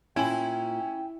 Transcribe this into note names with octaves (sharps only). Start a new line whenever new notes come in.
A#2 C#4 E4 G5 G#5 F#7